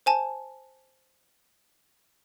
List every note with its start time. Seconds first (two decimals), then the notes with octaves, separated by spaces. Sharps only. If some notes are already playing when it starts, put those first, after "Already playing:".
0.06 C5 G#5 A5